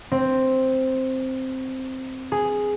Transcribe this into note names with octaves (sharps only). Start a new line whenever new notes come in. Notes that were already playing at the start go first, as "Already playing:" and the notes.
C4
G#4